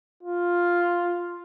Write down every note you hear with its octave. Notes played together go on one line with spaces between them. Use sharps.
F4